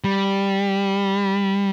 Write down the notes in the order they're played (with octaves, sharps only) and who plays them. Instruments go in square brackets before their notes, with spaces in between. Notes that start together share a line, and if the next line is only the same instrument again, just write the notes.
[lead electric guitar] G3